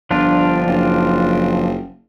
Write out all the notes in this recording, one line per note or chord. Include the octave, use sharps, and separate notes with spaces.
G1 F3 D4 F4
F#1